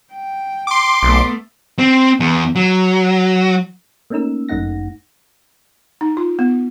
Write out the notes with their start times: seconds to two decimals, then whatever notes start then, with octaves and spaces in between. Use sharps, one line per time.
0.13 G5
0.67 C6 D6
1.03 B1 A3 B3
1.79 C4
2.20 E2
2.55 F#3
4.10 A3 A#3 C#4 D#4 A#4 E6
4.49 G1 F#2 A3 D#4 F#5 A#6
6.01 D#4
6.17 F4
6.39 B3